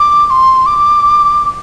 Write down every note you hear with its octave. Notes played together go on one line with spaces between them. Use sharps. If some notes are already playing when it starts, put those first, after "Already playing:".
Already playing: D6
D6
C6
D6